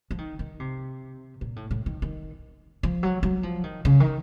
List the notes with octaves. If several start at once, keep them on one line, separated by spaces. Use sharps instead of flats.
F3
D#3
D#3
C3
A#2
A2
A2
D#3
D#3
F3
F#3
F#3
F3
D#3
C#3
D#3